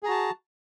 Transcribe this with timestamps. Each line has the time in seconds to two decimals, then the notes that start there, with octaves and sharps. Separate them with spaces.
0.03 G#4
0.06 A#5
0.08 F#4
0.11 A5